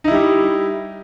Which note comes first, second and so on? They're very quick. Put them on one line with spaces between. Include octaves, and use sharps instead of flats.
D#4 E4 G3 G4